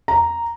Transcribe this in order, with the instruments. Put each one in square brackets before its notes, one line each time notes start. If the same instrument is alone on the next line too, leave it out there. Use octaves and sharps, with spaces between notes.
[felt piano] A#5